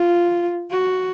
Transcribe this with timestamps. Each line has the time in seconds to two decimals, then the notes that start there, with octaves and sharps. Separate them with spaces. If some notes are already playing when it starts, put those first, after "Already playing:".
Already playing: F4
0.71 F#4